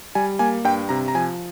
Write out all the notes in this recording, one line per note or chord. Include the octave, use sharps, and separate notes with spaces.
G3 G#5
A#3 G#5
G2 G5
C3 A#5
A#5
F3 G#5